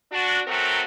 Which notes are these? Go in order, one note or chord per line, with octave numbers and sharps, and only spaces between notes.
D4 F#4
F#3 A3 C4 F#4 A#4